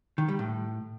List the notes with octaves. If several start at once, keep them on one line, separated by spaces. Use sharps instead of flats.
D#3
G3
A2